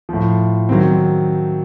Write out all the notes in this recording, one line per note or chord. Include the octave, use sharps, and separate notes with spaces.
A2 F3
D#3 F#3 C4